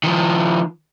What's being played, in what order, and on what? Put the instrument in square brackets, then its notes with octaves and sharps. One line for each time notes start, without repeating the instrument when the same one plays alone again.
[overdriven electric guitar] D#3 F3